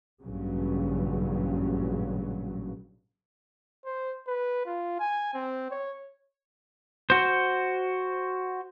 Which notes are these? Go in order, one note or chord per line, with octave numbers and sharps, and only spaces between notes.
A1 G2 A#2 C#3 F#3
C5
B4
F4
G#5
C4
C#5
F#4 C5